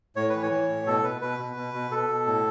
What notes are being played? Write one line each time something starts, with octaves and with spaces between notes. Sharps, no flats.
A2 C#5
E3 B4
C#5
E3
A2
B2 A4
B2 B4
B2 B4
B2
B2
B2
B2 A4
B2
A2